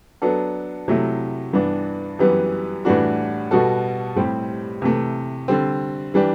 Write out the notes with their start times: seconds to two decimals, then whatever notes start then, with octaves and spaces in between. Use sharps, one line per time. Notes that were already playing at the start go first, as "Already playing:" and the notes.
0.22 F#3 B3 D4 A4
0.88 C3 F#3 A3 E4
1.53 G2 E3 B3 D4
2.19 F#2 E3 G3 B3
2.85 A2 E3 G3 D4 F#4
3.51 B2 G3 B3 F#4 A4
4.16 A2 G3 C4 G4
4.82 C3 E3 A3
5.48 D3 G3 C4
6.14 E3 G3 D4 G4